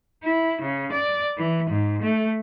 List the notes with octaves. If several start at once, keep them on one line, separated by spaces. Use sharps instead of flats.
E4
C#3
D5
E3
G#2
A3